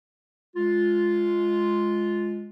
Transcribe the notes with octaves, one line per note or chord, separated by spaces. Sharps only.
G#3 F4